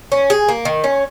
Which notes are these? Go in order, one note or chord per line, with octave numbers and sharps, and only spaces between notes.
C#4
G#4
A#3
D#3
C#4